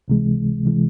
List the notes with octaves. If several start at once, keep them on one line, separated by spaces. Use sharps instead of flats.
C#2 C3 E3 G#3
C3 E3 G#3